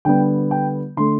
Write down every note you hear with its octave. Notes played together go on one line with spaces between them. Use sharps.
D3 G3 B3 G5
G5
D3 A3 C6